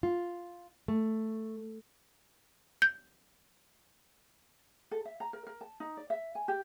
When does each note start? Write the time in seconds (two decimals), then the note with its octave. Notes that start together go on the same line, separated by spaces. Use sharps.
0.03 F4
0.88 A3
2.82 G6
4.91 A4
5.05 E5
5.20 A#5
5.33 A#4
5.47 A#4
5.61 A5
5.80 D#4
5.97 D5
6.10 E5
6.35 G#5
6.48 G4